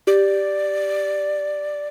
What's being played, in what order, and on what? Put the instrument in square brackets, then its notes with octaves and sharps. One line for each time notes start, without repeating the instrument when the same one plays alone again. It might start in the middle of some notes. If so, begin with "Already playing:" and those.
[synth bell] G4 [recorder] D5